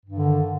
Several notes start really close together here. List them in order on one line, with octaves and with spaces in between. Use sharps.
G2 D#3 D3